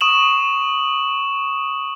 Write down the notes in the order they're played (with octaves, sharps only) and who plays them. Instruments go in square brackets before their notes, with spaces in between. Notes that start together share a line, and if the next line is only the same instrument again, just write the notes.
[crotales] C#6 D#6 E7 F#7